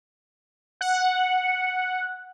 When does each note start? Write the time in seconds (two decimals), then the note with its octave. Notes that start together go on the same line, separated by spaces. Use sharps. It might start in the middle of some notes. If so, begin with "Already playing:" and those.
0.81 F#5